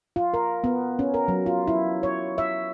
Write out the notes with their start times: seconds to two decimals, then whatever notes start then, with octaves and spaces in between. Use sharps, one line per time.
0.16 F4
0.34 A#4
0.64 B3
0.99 C#4
1.14 A#4
1.28 F#3
1.46 F4
1.68 E4
2.03 C#5
2.38 E5